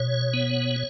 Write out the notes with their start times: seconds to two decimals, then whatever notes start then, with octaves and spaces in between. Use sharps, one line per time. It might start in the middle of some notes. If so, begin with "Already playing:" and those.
Already playing: B2 C#5
0.34 B3